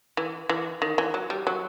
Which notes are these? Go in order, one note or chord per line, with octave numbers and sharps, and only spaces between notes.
E3
E3
D#3
E3
F#3
G3
F#3